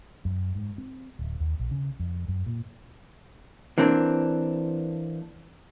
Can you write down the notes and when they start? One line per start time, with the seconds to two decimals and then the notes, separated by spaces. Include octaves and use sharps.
0.25 F#2
0.55 G#2
0.78 C4
1.19 D1
1.40 D#2
1.59 A#1
1.71 C#3
2.00 F2
2.28 F#2
2.46 A#2
3.78 E3 A#3 C4 D4